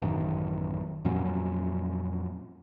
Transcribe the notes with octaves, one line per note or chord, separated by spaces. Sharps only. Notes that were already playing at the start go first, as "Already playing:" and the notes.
A1 F#2 D#3
F2 A#2 F#3 C#4